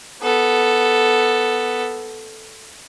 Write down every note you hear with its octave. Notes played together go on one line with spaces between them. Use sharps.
B3 A4